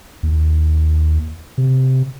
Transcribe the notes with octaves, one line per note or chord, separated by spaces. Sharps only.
D#2
C3